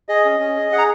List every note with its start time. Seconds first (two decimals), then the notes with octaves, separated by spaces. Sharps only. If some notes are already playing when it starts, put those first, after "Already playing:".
0.09 G#4 D#5
0.25 C#4
0.40 C#4
0.56 G#4
0.72 G#4 F#5
0.79 A#5